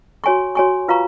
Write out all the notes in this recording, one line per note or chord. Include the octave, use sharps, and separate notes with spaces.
F#4 C#5 G#5 C#6
F#4 C#5 G#5 C#6
F4 B4 F5 A#5 C#6